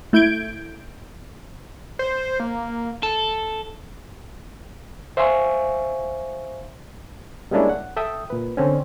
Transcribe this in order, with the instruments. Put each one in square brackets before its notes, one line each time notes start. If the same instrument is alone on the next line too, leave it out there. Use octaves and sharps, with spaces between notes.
[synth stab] A3 E4 G6 G#6 D7
[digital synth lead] C5
A#3
[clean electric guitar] A4
[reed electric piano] C5 E5 F5 G#5 C6 C#6
G3 G#3 A#3 C#4 D4 E4
F#5
A4 E5 G5 D#6
A#2 B4
D3 C4 C#4